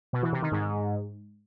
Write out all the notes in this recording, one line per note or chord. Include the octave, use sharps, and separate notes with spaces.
B2
E3
C3
D#3
G#2